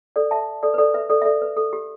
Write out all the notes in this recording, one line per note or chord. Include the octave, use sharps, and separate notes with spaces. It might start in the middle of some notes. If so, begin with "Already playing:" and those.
A4 D5
E5 A5
A4 D5
B4
A4 D5
B4 E5
A4 D5
E5
A4 D5
B4
A4
G4